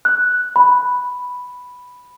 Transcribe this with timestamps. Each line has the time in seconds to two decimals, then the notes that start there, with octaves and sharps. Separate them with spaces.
0.05 F#6
0.56 B5